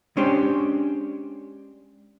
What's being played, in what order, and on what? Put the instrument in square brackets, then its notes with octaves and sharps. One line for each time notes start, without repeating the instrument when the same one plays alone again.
[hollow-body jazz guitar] G#3 C#4 D4 G4 C5